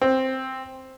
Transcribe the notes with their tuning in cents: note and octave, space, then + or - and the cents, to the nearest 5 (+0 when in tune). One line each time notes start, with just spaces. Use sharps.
C4 +5